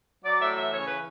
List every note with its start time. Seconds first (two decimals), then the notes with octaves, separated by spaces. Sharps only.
0.25 F#3 D5
0.40 A2 E5
0.56 E3 E5
0.72 C#3 C#5
0.87 E3 B4